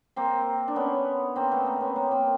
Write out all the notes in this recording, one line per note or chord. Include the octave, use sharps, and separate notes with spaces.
A#3 C4
D4
B3 C#4
A#3 C4
A3 B3
A#3 C4
B3 C#4
A#3 C4
A#3 C4